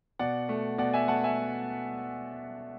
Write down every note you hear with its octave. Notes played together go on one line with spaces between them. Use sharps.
B2 D5 F#5
A3
B2 D5 F#5
E5 G#5
A3 F#5 A5
E5 G#5